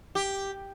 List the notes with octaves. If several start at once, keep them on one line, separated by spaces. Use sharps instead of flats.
G4